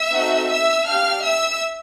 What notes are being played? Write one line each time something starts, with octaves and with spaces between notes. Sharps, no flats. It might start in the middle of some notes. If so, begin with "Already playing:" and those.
Already playing: E5 E6
C4 D#4 F#4 A4
E5 E6
D4 G4 F5 F6
E5 E6